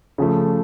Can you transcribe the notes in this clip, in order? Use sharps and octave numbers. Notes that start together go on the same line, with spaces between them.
C#3 F3 A3